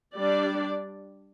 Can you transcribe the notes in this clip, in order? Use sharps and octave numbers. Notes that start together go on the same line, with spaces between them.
G3 D4 D5